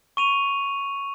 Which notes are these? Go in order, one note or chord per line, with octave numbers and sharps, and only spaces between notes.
C#6 D#7 F7